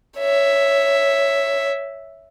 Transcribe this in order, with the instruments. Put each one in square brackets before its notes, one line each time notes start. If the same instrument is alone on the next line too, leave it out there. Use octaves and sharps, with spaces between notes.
[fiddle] C#5 E5